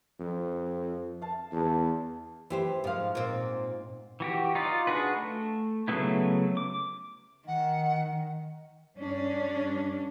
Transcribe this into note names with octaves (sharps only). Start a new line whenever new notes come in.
F2
F5 A5
E2
E3 G4 C5
G#2 F3 F5
A#2 C4
E3 F#4 G4
D#4 F4 D5
D4 F#4 G#4 B4
A3
C#3 F#3 A3 B3 E4
D6
D#3 F#5
G2 C#4 D4